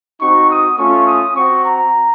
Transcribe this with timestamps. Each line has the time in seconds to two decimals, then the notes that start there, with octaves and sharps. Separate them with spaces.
0.21 C4 D#4 F#4 C#6
0.50 D#6
0.77 A3 C#4 F4 C#6
1.07 D#6
1.34 C4 F#4 C#6
1.64 A#5